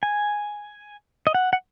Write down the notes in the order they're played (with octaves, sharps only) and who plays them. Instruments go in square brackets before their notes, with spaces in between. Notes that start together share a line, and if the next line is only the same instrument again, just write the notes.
[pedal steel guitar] G#5
D#5
F#5
F#5